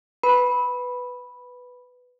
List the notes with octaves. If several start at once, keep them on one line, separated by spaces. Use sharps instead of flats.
B4 B5